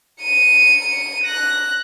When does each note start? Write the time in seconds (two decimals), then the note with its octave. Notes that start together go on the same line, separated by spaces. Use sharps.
0.22 C#7 D#7
1.24 F#6 A#6